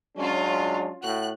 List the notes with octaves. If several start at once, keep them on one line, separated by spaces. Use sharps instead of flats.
F#3 G#3 C#4 D4 F4
A2 F#4 F#6